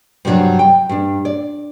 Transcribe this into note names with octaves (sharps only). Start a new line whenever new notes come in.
G2 C3 F3 F#3 D4
G5
G2 D4
D5